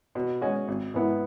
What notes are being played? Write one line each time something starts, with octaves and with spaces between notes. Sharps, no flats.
B2
G#3 C#4 F#4
G#1
G#2 E3 B3 E4